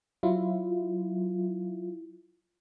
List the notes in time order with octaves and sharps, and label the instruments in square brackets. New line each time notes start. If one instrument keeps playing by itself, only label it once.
[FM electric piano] F#3 E4 F4